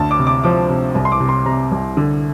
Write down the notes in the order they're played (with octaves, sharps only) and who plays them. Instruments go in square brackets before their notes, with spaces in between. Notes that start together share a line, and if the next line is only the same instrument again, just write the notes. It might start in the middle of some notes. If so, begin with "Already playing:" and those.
Already playing: [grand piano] D2 A5
D6
C3
D6
F3 D6
C3
C2
C6
D6
C3
C6
C3 A#5
C2
D3